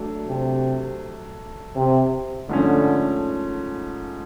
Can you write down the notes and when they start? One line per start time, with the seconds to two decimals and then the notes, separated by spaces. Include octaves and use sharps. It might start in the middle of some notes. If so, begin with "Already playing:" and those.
Already playing: F#3 A3 D4
0.28 C3
1.76 C3
2.49 G#2 D3 F3 A3 C#4